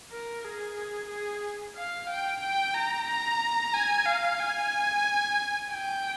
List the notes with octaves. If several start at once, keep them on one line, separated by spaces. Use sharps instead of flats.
A#4
G#4
G#4
F5
G5
G5
A#5
A#5
G#5
F5
G#5
G5